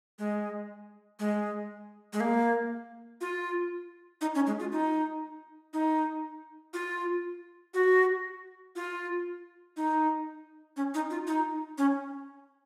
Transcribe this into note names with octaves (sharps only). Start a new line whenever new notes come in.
G#3
G#3
G#3
A#3
F4
D#4
C#4
G#3
F4
D#4
D#4
F4
F#4
F4
D#4
C#4
D#4
F4
D#4
C#4